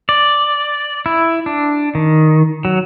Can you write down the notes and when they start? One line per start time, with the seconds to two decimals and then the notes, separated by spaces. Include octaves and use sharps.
0.09 D5
1.06 E4
1.46 D4
1.95 D#3
2.65 F#3